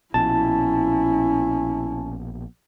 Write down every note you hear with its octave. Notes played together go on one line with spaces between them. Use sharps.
A#1 B2 C#4 E4 A5